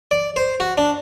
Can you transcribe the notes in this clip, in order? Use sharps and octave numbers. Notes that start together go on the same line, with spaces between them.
D5
C5
F#4
D4